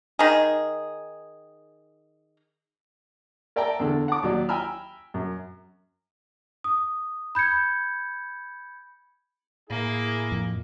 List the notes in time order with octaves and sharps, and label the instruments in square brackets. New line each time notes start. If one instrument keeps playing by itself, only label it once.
[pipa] D#3 G#4
[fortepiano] A#4 D5 E5 G5 A5 A#5
E2 D3 A4
F#5 A5 D6
D#2 F#3 D5
G5 G#5 A#5 B5 E6 F6
F#2
[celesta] D#6
B5 G6 G#6 C#7
[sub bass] A2 [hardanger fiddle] A#3 [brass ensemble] E4 G#4
[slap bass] F2